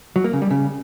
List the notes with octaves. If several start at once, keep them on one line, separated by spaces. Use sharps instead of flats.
F#3
A#3
C#3
G3
C#3